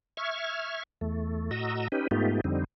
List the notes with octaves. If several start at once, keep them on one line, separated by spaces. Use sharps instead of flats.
E5 C#6 F6 G#6
E2 A3
A2 F#4 D#5 A#5 E6
C#4 D#4 G4 B4
G#2 A3 B3 D#4 F4 G4
F2 D3 G3 C4 D#4